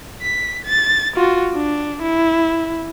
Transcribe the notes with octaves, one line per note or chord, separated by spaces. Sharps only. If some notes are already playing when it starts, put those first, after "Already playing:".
B6
A6
F4 F#4
D4
E4